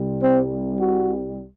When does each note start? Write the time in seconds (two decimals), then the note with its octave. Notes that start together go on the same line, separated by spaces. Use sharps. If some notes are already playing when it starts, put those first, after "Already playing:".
Already playing: C2 C3 G3
0.23 C4
0.78 F#4